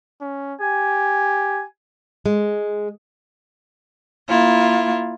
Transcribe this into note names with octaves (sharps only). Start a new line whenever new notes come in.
C#4
G4 G#5
G#3
A#3 E4 F4